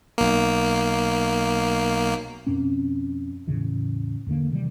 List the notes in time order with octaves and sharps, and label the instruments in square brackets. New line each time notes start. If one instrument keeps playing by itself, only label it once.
[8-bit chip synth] B1 A#3
[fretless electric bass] F2 B2 C4 C#4
E2 A2 C#3 E3
E2 D3 A#3
C3 D#3 E3 G3